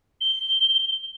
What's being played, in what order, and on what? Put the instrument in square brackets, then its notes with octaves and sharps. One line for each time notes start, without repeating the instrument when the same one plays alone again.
[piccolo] G7